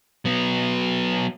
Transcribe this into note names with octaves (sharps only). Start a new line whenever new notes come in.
F#3 B3